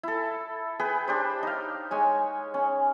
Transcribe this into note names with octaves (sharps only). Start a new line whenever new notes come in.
E4 A4
G#4 B4 G5
D4 G4 C5
D#4 F5
G#3 C#5 G#5
C#4